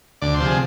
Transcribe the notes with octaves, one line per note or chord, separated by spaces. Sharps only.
D2 D5
C5
C3 F3
G#4